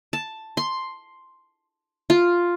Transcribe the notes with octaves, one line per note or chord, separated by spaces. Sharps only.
A5
C6
F4